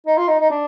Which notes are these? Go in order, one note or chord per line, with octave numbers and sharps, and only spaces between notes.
D#4
F4
D#4
D#4
D4